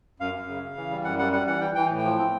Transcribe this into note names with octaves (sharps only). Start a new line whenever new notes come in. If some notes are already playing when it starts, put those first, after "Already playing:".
F#2 F5
F#2
C#3
C#3
E3
G3
F#2 F#5
G3 F#5
G3 F#5
E3 F#5
E3 G5
E3 G5
A2
G5
F3
C4